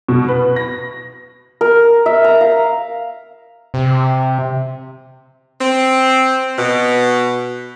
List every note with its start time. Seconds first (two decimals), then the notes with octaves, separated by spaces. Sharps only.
0.09 B2
0.28 B4
0.56 A#6
1.61 A#4
2.06 E5
2.24 A#5
2.41 F5
3.74 C3
5.61 C4
6.57 B2